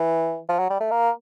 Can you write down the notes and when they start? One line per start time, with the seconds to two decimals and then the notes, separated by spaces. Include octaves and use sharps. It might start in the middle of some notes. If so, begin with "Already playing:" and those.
Already playing: E3
0.49 F3
0.59 F#3
0.70 G3
0.80 A3
0.91 A#3